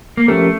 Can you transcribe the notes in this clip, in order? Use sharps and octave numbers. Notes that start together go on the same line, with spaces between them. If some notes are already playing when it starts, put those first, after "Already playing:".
A#3
F3 A3 C#4 G4 A#4